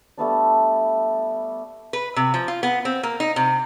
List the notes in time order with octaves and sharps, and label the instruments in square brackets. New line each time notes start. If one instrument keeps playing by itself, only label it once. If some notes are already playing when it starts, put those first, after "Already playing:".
[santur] G3 A3 B3 D4
[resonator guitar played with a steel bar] B4
C3
F3
F4
B3
C4
A#3
D#4
C3